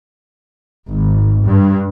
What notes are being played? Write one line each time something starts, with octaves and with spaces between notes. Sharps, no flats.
G#1
G2